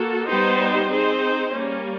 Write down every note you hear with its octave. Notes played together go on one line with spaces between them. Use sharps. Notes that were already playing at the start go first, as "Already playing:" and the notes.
Already playing: A#3 F#4 A4
G3 B3 D#4 G4 C5
C4 D#4 G#4 C5
G3 A#3 C#4